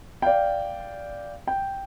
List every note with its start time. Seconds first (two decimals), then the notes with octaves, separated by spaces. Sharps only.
0.22 D5 F5 G5
1.47 G5